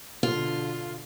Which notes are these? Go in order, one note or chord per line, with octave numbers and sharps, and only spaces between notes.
B2 D3 F4